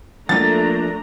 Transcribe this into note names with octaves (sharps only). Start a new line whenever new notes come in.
F3 A3 A#3 D4 A#5 A6